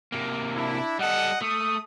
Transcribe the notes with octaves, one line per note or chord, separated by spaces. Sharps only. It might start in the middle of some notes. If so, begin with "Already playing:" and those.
C3 A#3
D4 E4
G3 A4 D#5 F#5
A3 D#6